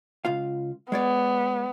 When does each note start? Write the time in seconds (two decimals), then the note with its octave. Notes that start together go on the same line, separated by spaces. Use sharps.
0.25 C#2 F4 F5
0.92 G#3 B3 C#5 D5